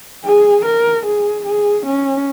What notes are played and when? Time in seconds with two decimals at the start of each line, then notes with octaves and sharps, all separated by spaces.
0.25 G#4
0.66 A#4
1.06 G#4
1.46 G#4
1.86 C#4